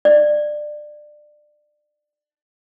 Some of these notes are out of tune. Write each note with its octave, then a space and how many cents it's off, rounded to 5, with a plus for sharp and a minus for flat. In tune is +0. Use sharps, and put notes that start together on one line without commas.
D5 +20